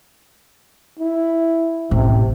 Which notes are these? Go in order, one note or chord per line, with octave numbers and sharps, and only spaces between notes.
E4
A1 C3